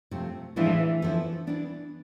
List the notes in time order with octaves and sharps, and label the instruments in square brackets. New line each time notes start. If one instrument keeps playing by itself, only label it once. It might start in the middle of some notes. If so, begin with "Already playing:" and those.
[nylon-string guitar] C3 F3 A3 C4
[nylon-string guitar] A2 F3 G#3 D4 F4 [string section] E3
[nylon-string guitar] D3 F3 B3 E4 A4
E3 B3 D4